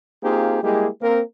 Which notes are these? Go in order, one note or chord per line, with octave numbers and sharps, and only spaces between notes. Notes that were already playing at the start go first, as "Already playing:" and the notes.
A#3 C4 D#4 F4 G4 G#4
G3 G#3 A#3 E4 G4 G#4
A#3 C4 A#4